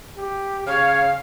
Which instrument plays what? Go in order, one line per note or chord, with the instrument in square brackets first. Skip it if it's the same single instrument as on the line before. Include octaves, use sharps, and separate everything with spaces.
[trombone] G4
[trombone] C#3 [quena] C#5 [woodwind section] F5